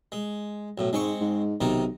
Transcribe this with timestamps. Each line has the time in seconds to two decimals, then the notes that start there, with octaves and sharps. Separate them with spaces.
0.12 G#3
0.78 B1 A2
0.93 G#2 G#3 C4 C#6
1.21 G#2
1.61 B1 C3 D#3 D#4